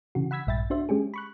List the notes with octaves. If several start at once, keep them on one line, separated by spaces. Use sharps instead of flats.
C#3 E3 F#4
F#5 B5 E6 G#6 B6
A#1 G2 E5 G5 B5 A6
D4 F#4 C5 E5
G#3 C#4 G4 G#4
B5 C#6 F#6